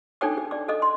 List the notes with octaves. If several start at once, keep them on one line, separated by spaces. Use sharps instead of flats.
D4 D#4 A4 C#5 G5 D6
G#4
D5 D6
A4 D#5 D6
C6